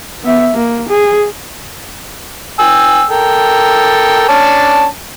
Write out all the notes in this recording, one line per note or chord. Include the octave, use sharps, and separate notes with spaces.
B3 E5
A#3
G#4
G5 G#5 E6
A4 A#4 G5
C#4 D4 A5